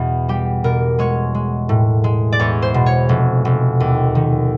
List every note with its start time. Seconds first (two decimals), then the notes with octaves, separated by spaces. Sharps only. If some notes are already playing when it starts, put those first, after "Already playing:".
Already playing: E2 B2
0.29 G3 G4
0.64 B2 A#4
0.99 G#3 C#5
1.35 G#3
1.69 A2
2.04 G#3
2.33 D5
2.39 E2 C#5
2.62 C5
2.74 B2
2.86 C#5
3.09 F1
3.45 F1
3.80 D#2
4.15 D#3